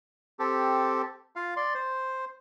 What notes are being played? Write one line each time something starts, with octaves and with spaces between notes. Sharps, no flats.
C4 G4 A4
F4 F5
D5 C6
C5